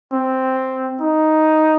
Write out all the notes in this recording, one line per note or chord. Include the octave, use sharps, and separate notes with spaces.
C4
D#4